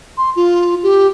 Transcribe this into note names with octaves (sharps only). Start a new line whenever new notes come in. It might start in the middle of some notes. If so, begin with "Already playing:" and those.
C6
F4
G4